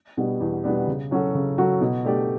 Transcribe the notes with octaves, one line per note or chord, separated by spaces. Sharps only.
B2 G3 B3 D4
E2
B2 G3 B3 D4
C#3
F#3 C#4 F#4 A4
C#3
F#3 C#4 F#4 A4
B2
A3 D4 G4 D5